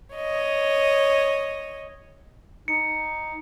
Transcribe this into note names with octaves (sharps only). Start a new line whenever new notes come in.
C#5 D#5
D#4 C#7